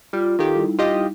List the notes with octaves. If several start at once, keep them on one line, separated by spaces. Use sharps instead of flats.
G3 F4
D#3 F4 G4 A4 F5
G3 D#4 E4
F4 G4 D#5